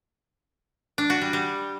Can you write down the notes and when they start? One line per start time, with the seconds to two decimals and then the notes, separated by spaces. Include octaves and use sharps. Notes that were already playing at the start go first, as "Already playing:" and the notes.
0.98 D4
1.10 F#4
1.21 G3
1.33 G3